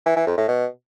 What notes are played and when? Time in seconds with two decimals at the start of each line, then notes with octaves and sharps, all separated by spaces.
0.06 E3
0.16 E3
0.27 F2
0.37 A2
0.48 B2